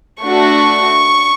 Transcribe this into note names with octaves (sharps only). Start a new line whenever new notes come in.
A3 D4 F#4 C#6